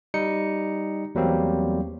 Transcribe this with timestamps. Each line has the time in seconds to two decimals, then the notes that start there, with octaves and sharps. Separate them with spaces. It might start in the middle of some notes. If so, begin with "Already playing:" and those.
0.14 G3 D#4 C#7
1.15 E2 F#3 G3 A#3 C4